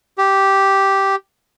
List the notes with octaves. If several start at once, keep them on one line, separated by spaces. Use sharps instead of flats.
G4